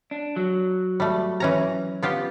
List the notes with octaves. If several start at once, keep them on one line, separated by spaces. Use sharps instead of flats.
D4
F#3
G3 A3
E3 C#4 A#5
B3 F4 G4